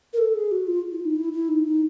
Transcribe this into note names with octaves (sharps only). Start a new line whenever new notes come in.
A#4
A4
G#4
F#4
F4
E4
D#4
E4
E4
D#4
D#4